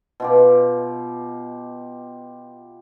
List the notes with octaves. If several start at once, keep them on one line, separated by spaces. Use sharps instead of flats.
B2 F4 G4